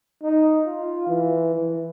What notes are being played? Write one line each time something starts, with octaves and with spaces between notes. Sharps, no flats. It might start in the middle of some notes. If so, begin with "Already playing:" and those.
D#4
F4
E3
E3